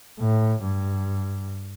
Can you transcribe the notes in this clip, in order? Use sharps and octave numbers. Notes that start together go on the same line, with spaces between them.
A2
G2